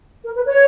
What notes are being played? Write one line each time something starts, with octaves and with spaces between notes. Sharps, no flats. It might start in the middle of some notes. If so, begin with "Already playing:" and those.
A#4
B4
C#5